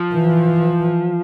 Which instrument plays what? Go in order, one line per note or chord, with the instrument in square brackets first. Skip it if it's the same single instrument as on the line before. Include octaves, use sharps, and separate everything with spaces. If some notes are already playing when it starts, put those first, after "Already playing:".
Already playing: [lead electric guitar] F3
[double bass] E3